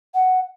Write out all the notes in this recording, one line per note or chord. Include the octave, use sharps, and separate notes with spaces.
F#5